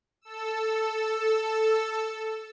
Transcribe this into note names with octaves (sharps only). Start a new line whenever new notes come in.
A4 E6